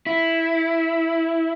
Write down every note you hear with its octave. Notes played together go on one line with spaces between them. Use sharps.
E4